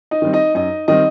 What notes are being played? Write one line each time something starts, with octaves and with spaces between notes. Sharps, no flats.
D#4 D#5
D#3 G3 C4
D#4 D#5
F#2 D#4 D#5
D#3 G3 C4 D#4 D#5